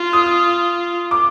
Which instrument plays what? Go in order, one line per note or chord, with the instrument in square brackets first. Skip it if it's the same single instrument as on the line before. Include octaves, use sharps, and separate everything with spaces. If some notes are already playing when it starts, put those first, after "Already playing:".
Already playing: [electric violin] F4
[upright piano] D#6
D6